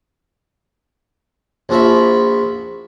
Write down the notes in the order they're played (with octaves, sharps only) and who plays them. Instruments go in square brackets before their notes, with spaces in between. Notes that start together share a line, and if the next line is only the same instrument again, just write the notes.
[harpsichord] A#1 F3 F#4 E5 B5